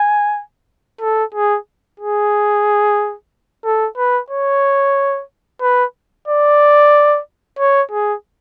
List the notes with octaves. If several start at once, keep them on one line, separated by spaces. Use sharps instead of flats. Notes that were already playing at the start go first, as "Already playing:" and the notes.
Already playing: G#5
A4
G#4
G#4
A4
B4
C#5
B4
D5
C#5
G#4